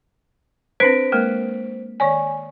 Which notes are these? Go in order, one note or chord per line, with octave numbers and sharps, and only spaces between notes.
C4 D4 B4 C5 B6 D7
G#3 A#3 A#4
D#3 C#5 D5 G#5